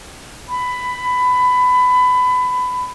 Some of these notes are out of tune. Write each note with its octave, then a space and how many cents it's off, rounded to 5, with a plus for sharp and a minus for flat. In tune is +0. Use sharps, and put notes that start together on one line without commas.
B5 +20